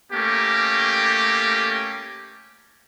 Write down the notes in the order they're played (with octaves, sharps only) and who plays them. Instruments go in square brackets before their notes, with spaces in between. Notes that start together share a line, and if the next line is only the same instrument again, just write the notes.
[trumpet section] A3 A#3 C#4 G4